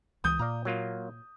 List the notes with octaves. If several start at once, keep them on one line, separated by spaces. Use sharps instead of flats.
C#2 E3 D#6 G6
A#2 D5 F5 A#5
F#3 A#3 F4